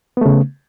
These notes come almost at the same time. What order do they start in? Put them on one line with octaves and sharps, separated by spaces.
B3 A3 C#3